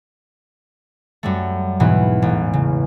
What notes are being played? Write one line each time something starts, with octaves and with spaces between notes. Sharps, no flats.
F#2 G3 A3
E2 G#2 B2 E3 B3
A1
C#3